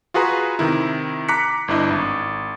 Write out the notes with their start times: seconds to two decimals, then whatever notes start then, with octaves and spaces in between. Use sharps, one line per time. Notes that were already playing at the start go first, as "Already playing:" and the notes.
0.14 F4 F#4 G#4 B4 A#5
0.59 C3 D#3 E4
1.28 A#5 D6 F#6 B6 C#7
1.68 G1 D4 E4 D#5
1.90 G#1